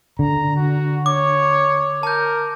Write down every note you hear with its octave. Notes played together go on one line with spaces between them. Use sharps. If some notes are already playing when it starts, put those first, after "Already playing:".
D3 A#5
F#4
C#5 D6
A#4 A5 G6